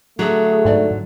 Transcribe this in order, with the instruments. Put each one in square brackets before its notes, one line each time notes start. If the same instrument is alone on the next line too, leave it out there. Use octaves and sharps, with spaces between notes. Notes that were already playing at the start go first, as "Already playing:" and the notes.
[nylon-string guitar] D3 F#3 [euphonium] A3 [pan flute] G#4
[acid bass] G#2 [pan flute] D5